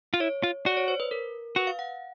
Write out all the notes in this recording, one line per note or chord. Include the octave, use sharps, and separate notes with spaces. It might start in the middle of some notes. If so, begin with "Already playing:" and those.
F4
E4 C#5
F4
F#4 D5
C#5
C5
B4
A#4
F#4 B4
F5
F#5